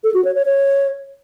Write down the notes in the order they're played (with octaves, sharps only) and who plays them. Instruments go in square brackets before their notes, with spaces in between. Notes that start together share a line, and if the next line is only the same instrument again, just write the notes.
[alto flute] A4
F#4
C#5
C#5
C#5